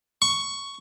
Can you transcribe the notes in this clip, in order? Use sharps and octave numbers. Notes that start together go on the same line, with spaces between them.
C#6